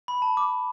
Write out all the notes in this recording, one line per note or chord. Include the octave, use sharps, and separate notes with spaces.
B5
A5
D6